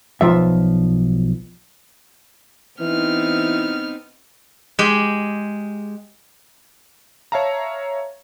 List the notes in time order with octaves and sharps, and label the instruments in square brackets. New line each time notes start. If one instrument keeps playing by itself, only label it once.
[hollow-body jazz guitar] B1 F3 E5
[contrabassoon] E3 [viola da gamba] B3 C4 D#4 [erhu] F6
[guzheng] G#3 G4
[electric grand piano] C#5 E5 F5 A5 A#5